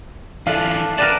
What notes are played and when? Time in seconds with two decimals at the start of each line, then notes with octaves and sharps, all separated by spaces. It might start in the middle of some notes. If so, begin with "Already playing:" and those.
0.47 E3 D4 F4 A4 E5 F5
0.98 A#4 B4 D5 G5 A5